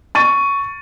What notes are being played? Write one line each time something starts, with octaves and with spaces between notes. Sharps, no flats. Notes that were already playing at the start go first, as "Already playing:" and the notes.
C#6 A6 D#7